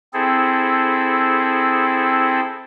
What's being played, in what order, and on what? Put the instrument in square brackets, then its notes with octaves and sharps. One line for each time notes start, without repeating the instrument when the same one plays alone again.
[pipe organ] C4 E4 G#4 A4